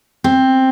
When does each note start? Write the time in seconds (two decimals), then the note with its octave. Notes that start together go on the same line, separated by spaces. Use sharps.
0.24 C4